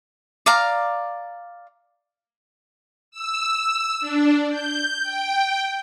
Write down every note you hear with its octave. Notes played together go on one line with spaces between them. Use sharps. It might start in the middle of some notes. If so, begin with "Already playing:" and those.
D5 F5 A#5
E6
D4
G6
G5